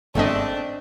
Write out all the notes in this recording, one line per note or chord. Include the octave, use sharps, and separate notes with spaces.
G1 G#2 A3 C4 D4 D#5 E5